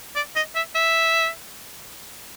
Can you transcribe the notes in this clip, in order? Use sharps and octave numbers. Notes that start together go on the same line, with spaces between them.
D5
D#5
E5
E5